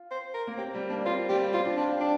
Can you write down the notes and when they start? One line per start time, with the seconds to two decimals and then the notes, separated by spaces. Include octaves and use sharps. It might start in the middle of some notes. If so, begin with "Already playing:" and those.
Already playing: F4
0.11 C5
0.34 A#4
0.47 A#3
0.57 C4 G4
0.75 G3
0.89 A#3 D4
1.05 C4 F4
1.29 G3 G4
1.53 C4 F4
1.65 D4
1.77 D4 F4
1.90 G4
2.01 D4